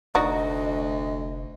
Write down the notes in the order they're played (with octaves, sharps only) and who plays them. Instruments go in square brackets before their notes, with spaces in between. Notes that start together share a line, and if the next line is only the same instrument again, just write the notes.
[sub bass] F1 [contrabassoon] D2 [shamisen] D#4 F#4 D5 [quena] D#5